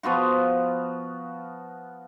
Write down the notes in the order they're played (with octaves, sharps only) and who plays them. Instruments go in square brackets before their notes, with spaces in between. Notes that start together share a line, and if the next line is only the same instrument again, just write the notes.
[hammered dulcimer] F3 B3 F4 F#4